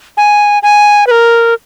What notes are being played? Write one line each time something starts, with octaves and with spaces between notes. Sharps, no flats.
G#5
G#5
B4
A#4